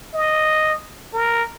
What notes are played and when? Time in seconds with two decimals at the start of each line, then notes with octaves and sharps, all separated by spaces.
0.14 D#5
1.14 A#4